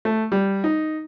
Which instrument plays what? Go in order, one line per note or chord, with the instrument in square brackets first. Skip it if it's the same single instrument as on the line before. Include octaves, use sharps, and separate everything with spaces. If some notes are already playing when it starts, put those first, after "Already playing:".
[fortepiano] A3
G3
D#4